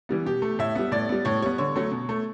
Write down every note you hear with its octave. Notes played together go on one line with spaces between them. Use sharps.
E3 G3 B3
B2 G4
A3
A2 E5
G3 B3
A2 D5
G3 B3
A2 C#5
G3 B3 C#5
D3 C#5
F#3 A3
B2
A3